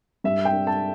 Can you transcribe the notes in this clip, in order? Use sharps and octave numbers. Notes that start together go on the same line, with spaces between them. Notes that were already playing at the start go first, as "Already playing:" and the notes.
G2 E5
G5
D4
A5